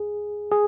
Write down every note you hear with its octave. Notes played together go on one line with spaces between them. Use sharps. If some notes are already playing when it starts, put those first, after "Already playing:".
Already playing: G#4
G#4